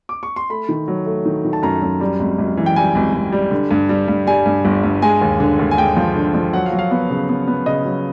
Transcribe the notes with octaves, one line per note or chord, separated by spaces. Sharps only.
D6
C#6
C6
A3 B5
D#3
F#3
A3
D#3
D#3
A5
F#2 A#5
F#2
G3
G#1
G#1
E3
G5
G3 G#5
G#1
G#1
G3
D3
G2
G3
G2
G3 G#5
G2
G1
G2
G#3 G#5
D#2
D3
D#2
G#5
G#3 G5
F3
D3
F3
F#3 F#5
F5
F#3
F5
B3
C#3
B3
B3
C#3 D#5
F#3